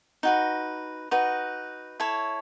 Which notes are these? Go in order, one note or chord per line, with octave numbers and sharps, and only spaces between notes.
D#4 F#4 B4
D#4 F#4 B4
E4 A4 C#5